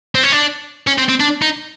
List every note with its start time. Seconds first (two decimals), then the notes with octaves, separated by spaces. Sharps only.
0.15 C4
0.23 C#4
0.32 D4
0.87 C#4
0.98 C4
1.09 C4
1.20 D4
1.42 D#4